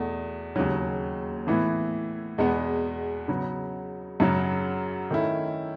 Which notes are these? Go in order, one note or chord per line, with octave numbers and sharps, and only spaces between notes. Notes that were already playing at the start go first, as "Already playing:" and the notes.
Already playing: E2 B2 A3
D#2 C#3 F#3
A2 E3 B3 E4
E2 B2 G#3 B3
C#3 F#3 B3
F#2 C#3 F#3
D#3 A3 C#4 E4